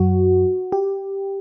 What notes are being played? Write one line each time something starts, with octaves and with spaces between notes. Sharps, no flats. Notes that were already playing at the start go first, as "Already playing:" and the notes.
Already playing: F#2 F#3 F#4
G4